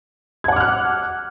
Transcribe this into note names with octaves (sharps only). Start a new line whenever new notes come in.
F#5 D6 F6 F#6 G#6